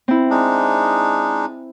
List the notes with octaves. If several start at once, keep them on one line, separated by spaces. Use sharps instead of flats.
C4 E4
G#3 D4 D#4